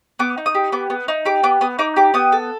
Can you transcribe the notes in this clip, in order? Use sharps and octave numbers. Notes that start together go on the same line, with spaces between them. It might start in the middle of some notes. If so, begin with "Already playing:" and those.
B3 D6
D#4
D#6
G4
B3 D6
B3
D#4
G4 D6
B3 D6
B3 D#6
D#4 D6
G4 D6
B3 D#6
A4